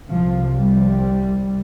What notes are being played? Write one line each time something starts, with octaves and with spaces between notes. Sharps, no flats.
C2 C3 F3
G3